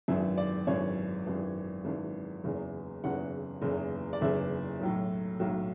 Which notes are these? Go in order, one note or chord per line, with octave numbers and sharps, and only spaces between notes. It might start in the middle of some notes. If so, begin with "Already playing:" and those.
G#1 F#2 E3 E5
D5
G#1 F#2 E3 C#5
G#1 F#2 E3
G#1 F#2 E3
F#1 E2 C#3 E3
F#1 E2 C#3 E3 F#5
F#1 E2 C#3 E3
D5
F#1 E2 C#3 E3 E5
B1 A2 F#3
B1 A2 F#3